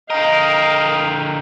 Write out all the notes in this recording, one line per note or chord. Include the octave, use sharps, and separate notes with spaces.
D3 A#4 D#5 F5 G5